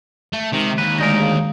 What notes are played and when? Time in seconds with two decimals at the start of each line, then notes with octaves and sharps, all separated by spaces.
0.33 A3
0.53 C3 D#3 G#3
0.78 D#2 B4
0.98 D2 G#3 D#4 A#4 D5 A#6
1.17 D#3 G#4 F5